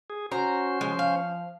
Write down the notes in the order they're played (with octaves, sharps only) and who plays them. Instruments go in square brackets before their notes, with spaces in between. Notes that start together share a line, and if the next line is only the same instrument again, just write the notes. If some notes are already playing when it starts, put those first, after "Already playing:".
[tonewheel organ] G#4
[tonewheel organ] C#4 C5 [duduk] F#4 [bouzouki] A#5
[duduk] F3 [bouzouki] G#3
[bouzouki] F5